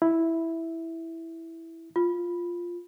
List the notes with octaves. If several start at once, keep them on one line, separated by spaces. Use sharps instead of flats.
E4
F4